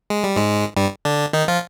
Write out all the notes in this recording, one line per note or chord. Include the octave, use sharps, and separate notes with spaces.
G#3
G3
G#2 G#3
G2 G3
D3 D4
D#3 D#4
F3 F4